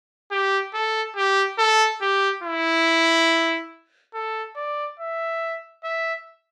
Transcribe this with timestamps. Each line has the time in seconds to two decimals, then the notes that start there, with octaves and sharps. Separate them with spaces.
0.31 G4
0.74 A4
1.16 G4
1.58 A4
2.01 G4
2.43 E4
4.14 A4
4.56 D5
5.00 E5
5.84 E5